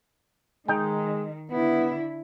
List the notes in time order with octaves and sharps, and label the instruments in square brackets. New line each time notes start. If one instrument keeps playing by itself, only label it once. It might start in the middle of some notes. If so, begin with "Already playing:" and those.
[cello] D#3 [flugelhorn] G#3 [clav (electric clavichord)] D#4 G5
[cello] D3 E4 [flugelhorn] B3